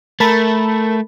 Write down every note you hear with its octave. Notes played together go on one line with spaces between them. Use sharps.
A3 A#4 A5 B5